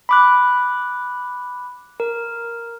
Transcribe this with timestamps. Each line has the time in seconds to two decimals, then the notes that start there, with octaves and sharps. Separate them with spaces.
0.09 B5 D6 F#6
2.00 A#4